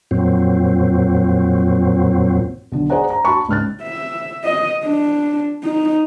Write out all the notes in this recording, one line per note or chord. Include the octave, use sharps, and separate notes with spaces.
F2 A#2 F#3 C4
B1 D3
G#4 C5 D5 F#5 A#5
A#5
F#4 A5 B5 C#6
C#2 G#2 F6 F#6 A6
E5
D#5
D4
D#4